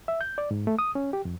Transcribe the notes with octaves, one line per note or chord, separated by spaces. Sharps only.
E5
G6
D5
G#2
A3
D#6
C#4
G4
F2